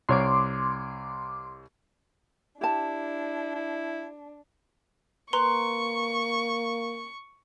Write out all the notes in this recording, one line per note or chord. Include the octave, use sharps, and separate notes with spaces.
C2 C#5 C6 D6
D4 E4 G4 A5
E4
A#3 B4 A#5 C6 C#6